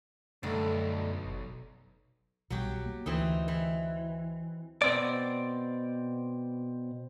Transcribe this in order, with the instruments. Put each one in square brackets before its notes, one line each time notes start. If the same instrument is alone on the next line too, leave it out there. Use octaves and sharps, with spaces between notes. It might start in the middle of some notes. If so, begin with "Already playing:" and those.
[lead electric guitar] B1 [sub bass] F#2 [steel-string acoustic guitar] D3 G3 A3
[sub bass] F#1
[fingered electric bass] B1 B2 G3 [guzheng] F#3 F#4 G4
[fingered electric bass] A#3
[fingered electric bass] D2 [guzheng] E3 C4 D#4
[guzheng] E3
[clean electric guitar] B2 C4 D5